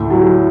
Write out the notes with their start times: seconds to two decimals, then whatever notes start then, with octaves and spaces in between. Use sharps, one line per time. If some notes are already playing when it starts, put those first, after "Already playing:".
Already playing: D2 A2
0.10 F#3